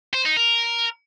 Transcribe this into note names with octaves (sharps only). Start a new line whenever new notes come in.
C5
D#4
A#4